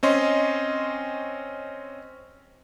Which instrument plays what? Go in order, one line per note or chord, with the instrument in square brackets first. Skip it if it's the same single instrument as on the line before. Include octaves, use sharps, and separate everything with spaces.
[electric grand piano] C4 C#4 D#5 C6